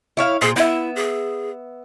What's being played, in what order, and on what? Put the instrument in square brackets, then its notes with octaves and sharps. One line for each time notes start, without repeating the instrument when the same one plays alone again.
[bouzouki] E4 C#5 F5
[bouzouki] A#2 C5 [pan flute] G#4
[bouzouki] B3 E5 [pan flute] E4
[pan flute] G#4